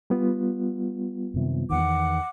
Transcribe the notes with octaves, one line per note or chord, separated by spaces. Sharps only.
G3 B3 F4
F#2 C3 D#3
E2 D#3 F#5 D6